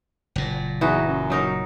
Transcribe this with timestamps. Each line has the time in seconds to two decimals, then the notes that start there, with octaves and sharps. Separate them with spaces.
0.36 F#1 A#2
0.81 E2 E3 D#4 F#4
1.08 F#2
1.30 F#3 D#4 A#4